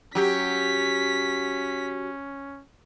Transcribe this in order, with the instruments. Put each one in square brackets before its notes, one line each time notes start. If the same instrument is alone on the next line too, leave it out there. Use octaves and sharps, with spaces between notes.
[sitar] F#3 G4 [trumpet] C#4 [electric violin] B6